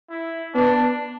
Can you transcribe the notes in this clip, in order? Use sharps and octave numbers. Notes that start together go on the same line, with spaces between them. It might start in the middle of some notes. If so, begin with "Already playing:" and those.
E4
B3 D4